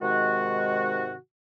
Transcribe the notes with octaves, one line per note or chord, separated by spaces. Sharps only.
G#2 C3 D#3 G#3 F#4